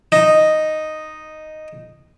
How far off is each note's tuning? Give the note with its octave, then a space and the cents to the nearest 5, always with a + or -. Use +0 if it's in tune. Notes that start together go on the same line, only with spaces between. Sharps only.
D#4 -5